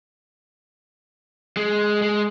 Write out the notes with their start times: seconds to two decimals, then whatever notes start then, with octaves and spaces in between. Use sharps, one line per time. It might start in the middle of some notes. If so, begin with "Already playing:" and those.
1.57 G#3
2.02 G#3